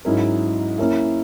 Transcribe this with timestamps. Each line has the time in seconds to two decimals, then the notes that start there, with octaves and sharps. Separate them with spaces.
0.05 G#2 F#3 C#4 E4 A#4
0.78 A#3 C#4 E4 A#4 E5